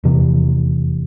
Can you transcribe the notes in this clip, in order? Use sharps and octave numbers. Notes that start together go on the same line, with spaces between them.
F1 E2 C3 E3